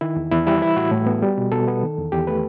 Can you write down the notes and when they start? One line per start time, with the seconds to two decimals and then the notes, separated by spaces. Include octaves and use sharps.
0.01 D#3 E4
0.16 E2
0.32 E2 E4
0.47 G3 E4
0.62 E3 E4
0.76 A2 F#4
0.92 A2
1.06 B3
1.23 G3
1.38 B2
1.52 B2 A4
1.68 B3
1.83 D#3
1.98 E2
2.12 E2 G4
2.27 A3 B4